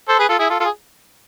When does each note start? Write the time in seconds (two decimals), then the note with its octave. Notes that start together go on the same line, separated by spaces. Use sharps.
0.08 A4 C5
0.19 G#4 B4
0.29 F4 A4
0.39 E4 G#4
0.50 F4 A4
0.60 F4 A4
0.65 G#4